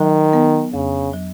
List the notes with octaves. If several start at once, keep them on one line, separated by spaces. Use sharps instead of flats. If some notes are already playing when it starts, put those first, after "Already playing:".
Already playing: D#3 F#3
B3
F2 C#3
F#3